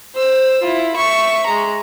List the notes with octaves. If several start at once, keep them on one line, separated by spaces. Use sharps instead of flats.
C5 E6
E4 F4
E5 C#6
G#3 A#5